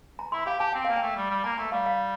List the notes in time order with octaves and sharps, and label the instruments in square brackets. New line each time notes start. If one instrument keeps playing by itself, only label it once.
[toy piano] A#5
[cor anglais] E4 [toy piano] C6
[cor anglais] G4 [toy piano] F5
[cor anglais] G4 [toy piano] A5
[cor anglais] C4 [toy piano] G5
[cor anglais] A#3 [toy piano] F5
[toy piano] G5
[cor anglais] A3
G3
G3
[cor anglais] A#3 [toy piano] A#5
[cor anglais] A3 [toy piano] A#5
[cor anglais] G3 [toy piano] F5
[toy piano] F5